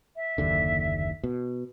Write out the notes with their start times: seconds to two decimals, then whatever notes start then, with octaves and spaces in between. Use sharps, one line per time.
0.16 E5
0.38 F#1 D#2 D3
1.24 B2